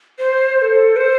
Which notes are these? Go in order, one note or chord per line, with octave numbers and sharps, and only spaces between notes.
C5
C5
A4
C5